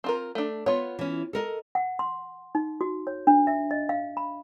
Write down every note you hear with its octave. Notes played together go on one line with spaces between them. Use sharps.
C4 F4 A#4
A3 D4
B3 F4 C#5
E3 C#4
A4 A#4 D#5
F#5
C6
D#4
F#4
C#5
D4
E5
D#5
F5
B5